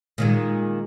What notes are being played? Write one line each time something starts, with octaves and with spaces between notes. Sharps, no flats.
A#2 D#3 G#3